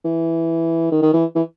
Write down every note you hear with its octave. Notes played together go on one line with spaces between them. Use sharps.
E3
D#3
D#3
E3
E3